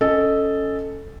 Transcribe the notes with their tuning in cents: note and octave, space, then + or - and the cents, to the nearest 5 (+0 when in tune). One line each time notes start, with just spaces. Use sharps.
C#4 +0 A4 +0 D#5 +0